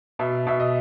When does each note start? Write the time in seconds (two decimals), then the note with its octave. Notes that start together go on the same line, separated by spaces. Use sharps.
0.19 B2 E5
0.46 B2 E5
0.60 D#5